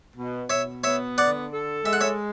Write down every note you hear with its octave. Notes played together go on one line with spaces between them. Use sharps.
B2
B2 C#5 E5
B3 C#5 E5
D3 D5 F#5
A4
G#3 E5
F#5
C#5 E5